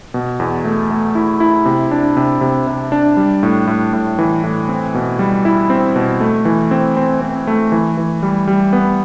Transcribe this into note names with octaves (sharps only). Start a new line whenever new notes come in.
B2
E2
A3
A3
E4
E4
C3
D4
C3
C3
C3
D4
G3
A2
A2
A2
E3
A2
C4
B2
G3
E4
C4
B2
A3
E3
C4
C4
C4
A3
E3
E3
G3
G3
B3